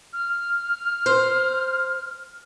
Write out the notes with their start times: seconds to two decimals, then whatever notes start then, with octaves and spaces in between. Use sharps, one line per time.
0.13 F6
1.06 C5